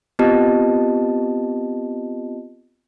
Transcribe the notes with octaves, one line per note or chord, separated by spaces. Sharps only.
B3 C4 F4 G4 D#5 A5